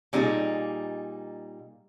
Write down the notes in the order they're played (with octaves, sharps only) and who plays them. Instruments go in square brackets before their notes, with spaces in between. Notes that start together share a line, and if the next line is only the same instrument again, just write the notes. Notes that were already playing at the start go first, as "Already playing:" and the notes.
[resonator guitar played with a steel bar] A#2 G3 D#4 F#4 G#4